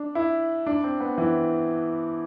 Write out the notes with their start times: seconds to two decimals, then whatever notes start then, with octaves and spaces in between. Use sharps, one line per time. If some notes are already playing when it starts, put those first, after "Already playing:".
Already playing: D4
0.15 E4
0.66 D4
0.84 C4
1.00 B3
1.18 E3